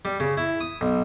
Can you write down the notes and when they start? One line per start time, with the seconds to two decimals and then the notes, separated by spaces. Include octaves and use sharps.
0.05 G3
0.20 C#3
0.37 E4
0.61 D#6
0.81 B1